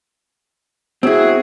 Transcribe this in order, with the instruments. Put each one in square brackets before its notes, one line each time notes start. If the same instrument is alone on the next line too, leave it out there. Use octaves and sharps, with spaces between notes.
[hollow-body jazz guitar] C4 E4 [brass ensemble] F#4 G#4